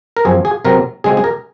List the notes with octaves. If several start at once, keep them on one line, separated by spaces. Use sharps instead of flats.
A#4
F#2 F3 C4 G#4
G#4
C3 F#3 C4 A#4
C#3 G#3 C4 G#4
G#4
A#4